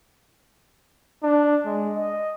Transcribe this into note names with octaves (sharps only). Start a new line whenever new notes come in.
D4
G#3
D#5